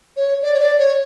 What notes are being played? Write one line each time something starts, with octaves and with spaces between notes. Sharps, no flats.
C#5
D5
C#5
D5
C#5